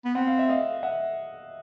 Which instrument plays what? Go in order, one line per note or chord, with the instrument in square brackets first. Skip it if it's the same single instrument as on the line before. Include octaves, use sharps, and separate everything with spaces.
[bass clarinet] B3
[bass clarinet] C4 [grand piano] F#5
[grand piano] F5
E5
D#5 F5
E5 F#5